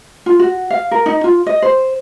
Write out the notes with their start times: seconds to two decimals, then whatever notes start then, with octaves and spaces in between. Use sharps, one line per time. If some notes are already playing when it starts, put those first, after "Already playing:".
0.26 F4
0.39 F#4
0.70 F5
0.91 A#4
1.06 D#4
1.24 F4
1.46 D#5
1.62 C5